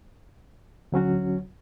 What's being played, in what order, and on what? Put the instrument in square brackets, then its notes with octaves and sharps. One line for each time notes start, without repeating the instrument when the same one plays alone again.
[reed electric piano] D2 F#3 C#4 F#4